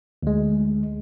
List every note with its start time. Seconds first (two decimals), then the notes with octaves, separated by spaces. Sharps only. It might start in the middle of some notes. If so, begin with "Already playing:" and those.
0.23 D2 G#3